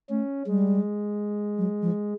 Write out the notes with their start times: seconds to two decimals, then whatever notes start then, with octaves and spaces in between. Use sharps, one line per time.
0.09 A3 C#4
0.46 G3 G#3
1.58 F#3
1.82 F3